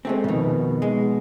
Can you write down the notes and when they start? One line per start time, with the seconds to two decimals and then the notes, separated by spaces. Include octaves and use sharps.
0.05 G#3 A3 C4
0.24 F2 B2 D#3
0.82 G#3